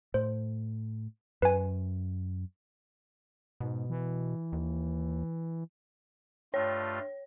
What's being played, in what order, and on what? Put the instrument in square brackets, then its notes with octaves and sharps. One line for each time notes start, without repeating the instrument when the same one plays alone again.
[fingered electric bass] A2 [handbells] C5
[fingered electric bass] F#2 [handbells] B4 G#5
[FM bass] G#2 [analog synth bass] B2
[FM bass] E3
[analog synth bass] D#2
[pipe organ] G2 A3 F4 [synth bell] C#5